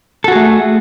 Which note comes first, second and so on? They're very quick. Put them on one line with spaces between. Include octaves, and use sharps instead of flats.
A4 F#4 G#4 A3